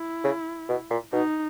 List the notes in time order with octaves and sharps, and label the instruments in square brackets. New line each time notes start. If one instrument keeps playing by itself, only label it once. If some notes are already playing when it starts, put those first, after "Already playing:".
Already playing: [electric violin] E4
[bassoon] C#3
B2
A#2
[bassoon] B2 [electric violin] D#4